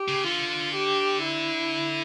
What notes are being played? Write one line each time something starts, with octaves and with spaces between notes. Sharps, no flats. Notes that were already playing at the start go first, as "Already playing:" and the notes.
Already playing: G4
C#3
D3 F4
G4
E4